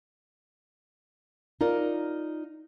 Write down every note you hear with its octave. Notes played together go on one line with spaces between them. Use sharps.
D#4 F4 A#4 D5